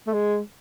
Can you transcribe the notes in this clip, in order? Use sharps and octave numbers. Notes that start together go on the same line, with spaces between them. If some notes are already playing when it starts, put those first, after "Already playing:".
A3
G#3